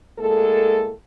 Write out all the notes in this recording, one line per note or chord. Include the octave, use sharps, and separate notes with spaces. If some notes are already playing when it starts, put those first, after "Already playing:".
A2 G#3 A#3 A4